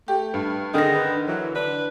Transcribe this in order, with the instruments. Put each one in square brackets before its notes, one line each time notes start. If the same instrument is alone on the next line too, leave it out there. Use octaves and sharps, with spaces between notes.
[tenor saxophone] A3 [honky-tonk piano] G4
[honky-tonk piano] G2
[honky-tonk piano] D3 A#6 [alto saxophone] D#3 [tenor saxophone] G#4
[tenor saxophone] B4
[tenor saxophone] E3 [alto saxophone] F#3
[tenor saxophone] D4 [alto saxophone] B4